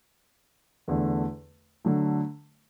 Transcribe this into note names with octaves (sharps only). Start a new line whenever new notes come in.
E2 D3 A3
D3 F#3 A3